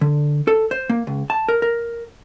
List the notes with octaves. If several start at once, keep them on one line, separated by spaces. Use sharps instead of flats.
D3
A4
C5
A#3
C#2
A5
A#4
A#4